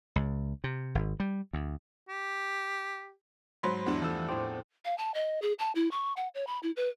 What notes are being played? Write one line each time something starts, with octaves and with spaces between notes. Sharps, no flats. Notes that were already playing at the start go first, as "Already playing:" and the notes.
C#2
C3
G#1
G3
D2
G4
G#2 F#3 C5 B5 C6
E2 G2 D4 E4
E3 F3 A3 E6
A2 C4 C5 D6
F5
A5
D#5
G#4
A5
E4
C#6
F#5
C#5
B5
E4
B4